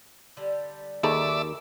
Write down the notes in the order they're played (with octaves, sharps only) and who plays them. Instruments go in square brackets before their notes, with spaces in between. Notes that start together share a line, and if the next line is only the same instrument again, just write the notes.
[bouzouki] D3 G3
[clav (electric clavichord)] D#2 [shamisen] D#4 G#4 A4 [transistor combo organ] D5 E5